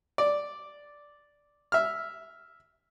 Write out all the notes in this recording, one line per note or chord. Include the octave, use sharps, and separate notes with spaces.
D5
E5 F6